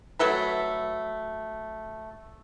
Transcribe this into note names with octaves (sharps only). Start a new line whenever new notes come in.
F#3 A3 A4 B4